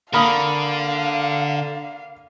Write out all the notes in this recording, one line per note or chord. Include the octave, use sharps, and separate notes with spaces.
D3 A#3 F5 B5 D#6